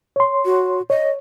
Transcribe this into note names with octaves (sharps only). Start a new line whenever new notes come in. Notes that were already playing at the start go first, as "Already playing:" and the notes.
C#5 C6
F#4
C#5 D#5